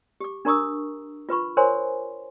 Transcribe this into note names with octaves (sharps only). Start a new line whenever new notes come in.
G4 D6
D4 A#4 A#5 C#6 D#6 E6
F4 B4 B5 C#6
A#4 C5 C#5 G#5 C6